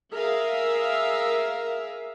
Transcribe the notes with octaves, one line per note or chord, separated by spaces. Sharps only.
G#4 A#4 E5 F5